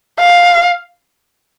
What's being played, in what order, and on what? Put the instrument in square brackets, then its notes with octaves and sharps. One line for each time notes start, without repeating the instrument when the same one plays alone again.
[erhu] F5